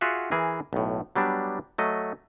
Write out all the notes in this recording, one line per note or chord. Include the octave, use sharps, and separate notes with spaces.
F4 F#4 G#4 E5 F#5
E3 G#4 A#4
B1 A2
F#3 G3 B3 D4
F#3 A3 D#5